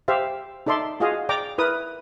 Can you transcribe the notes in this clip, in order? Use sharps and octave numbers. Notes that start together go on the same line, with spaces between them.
G4 C5 E5 F5
D#4 A4 D5 E5 C6
F4 F#4 G#4 D#5 F5
D5 G5 A#5 D6
E4 A#4 B4 D#6